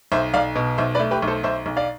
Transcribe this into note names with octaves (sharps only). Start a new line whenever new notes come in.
B1 C5 E5
B1 D5 F5
B2
B1 C5 E5
B4 D5
A3
G4 B4
B1
A4 C5
B1 C5 E5
B1
D5 F5